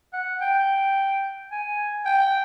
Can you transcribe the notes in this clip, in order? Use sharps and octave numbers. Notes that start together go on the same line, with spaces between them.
F#5
G5
G#5
G5